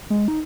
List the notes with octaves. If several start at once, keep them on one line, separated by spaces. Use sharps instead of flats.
G#3
D#4